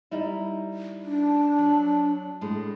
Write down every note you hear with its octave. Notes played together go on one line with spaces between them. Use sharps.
G3 D#4 E4
D4
F#3
A2 G#3